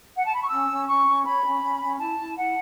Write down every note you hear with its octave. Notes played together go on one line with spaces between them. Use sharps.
F#5
A5
B5
C#6
C#4 E6
C#4
C#4 C#6
C#4
C#5 B5
C#4
C#4
C#4
E4 A5
E4
E4 F#5